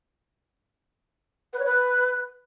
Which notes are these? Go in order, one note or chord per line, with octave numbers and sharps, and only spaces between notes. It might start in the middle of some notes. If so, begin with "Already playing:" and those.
B4
C#5
B4